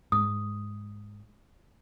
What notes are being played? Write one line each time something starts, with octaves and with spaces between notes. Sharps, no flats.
G#2 D#6